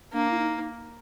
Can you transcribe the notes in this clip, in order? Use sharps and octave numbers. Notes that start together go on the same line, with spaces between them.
A#3 D4
E4
D#4